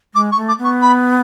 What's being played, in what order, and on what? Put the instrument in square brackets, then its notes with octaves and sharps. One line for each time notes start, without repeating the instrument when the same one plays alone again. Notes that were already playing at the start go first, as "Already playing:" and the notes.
[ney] G#3 [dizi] D6
[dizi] C#6
[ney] A3
[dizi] D6
[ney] B3
[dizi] C#6
B5